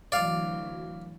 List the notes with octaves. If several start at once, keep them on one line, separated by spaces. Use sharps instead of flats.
D2 E3 F#3 D5 F5